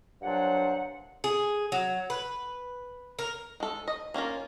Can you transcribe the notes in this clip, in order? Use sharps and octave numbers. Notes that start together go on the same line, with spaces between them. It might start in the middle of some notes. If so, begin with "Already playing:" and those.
G2 A#2 F#3 D4 C5 F#5
G#4
F#3
B4
A#4
G#3 A4
D#5
A#3 C#4 F4 A#4